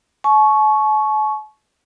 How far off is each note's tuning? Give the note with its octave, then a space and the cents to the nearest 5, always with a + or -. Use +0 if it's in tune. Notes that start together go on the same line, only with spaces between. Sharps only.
A5 -45 C#6 +0